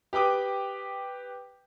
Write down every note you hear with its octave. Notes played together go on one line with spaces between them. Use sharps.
G4 B4 G5 D6 D#6